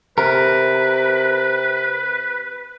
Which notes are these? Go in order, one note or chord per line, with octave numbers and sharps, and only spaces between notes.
C3 A#4 B4